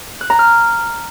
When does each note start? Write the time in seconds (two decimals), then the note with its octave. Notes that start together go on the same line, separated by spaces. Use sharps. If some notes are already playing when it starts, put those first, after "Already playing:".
0.21 F#6
0.30 A#5
0.39 F6